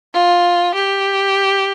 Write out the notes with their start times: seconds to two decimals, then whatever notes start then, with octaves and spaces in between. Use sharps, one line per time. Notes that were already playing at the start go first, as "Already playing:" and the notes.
0.14 F4
0.75 G4